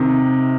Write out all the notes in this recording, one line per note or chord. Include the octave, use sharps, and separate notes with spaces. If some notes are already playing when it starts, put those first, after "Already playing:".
Already playing: C3 D#3